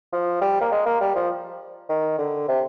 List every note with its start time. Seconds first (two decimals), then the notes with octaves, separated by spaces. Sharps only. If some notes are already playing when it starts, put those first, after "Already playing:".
0.13 F3
0.41 G3
0.61 A#3
0.72 G#3
0.86 A#3
1.01 G3
1.15 F3
1.89 D#3
2.18 D3
2.48 C3